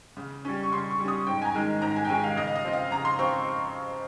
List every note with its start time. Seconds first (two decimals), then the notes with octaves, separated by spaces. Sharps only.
0.17 C#3
0.45 G3 C#4
0.63 C#6
0.72 C#3 C6
0.91 C#6
0.99 G3
1.04 C#4 D#6
1.27 G#2 G5
1.42 G#5
1.45 A#5
1.55 D#3 G#3 C#4
1.82 G#2 A#5
1.96 G#5
2.05 G5
2.09 D#3 G#3 C#4 G#5
2.23 F5
2.36 C#3 D#5
2.47 F5
2.55 D#5
2.65 F3 C4
2.73 F5
2.91 C#3 A#5
3.05 C6
3.19 F3 C4 C#6